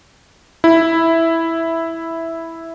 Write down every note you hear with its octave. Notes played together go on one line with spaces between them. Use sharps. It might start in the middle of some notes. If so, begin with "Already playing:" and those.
E4